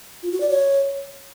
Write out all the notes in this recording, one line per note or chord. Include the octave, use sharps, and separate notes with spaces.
F4
F#4
D5
C#5